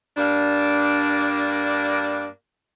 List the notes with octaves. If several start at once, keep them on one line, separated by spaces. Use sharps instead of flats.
G2 A#3 D4